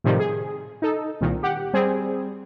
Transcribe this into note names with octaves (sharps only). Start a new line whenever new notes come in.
A2 C3 D#3 F3 G3
G#4
D#4 A4
C2 A#2 D#3
G4 F#5
G3 C4 G#4